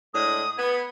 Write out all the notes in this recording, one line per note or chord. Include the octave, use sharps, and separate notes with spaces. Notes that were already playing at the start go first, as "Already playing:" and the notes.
A2 G#3 D4 D#6
B3 G#6